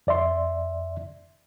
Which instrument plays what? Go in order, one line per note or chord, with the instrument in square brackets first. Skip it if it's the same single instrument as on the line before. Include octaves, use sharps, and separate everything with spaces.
[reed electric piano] F2 D5 E5 C6